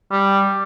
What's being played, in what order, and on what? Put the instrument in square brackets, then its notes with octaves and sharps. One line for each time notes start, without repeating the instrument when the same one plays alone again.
[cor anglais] G3